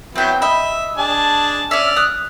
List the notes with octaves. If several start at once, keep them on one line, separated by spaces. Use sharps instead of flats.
F#3 B3 C4 E4 G5
D#5 E5 B5
D4 G#4 A5
C#4 D5 E5 F6
D#6 F#6